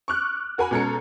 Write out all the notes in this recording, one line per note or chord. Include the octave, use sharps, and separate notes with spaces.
C#6 D6 F6 F#6
F#4 A#4 F#5 G#5 B5
B2 G#3 C#4 A4 A#5 C#7